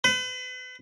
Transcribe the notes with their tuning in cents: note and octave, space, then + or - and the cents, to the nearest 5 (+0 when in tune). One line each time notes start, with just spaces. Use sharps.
B4 +40